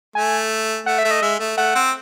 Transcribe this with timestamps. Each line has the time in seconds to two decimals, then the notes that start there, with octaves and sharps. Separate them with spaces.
0.15 A3 G#5
0.86 A3 F#5
0.99 E5
1.05 A3
1.11 D#5
1.22 G#3 E5
1.40 A3
1.57 A3 F#5
1.75 C4